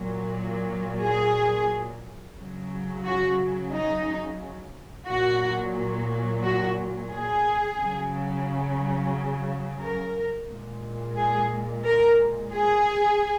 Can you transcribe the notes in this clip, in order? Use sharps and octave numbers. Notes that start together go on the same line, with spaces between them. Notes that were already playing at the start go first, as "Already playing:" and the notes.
Already playing: A#2 F#3
G#4
C#3 F#3
F#4
D#4
A#2 F#3 F#4
F#4
G#4
C#3 F#3
A#4
A#2 G#3
G#4
A#4
G#4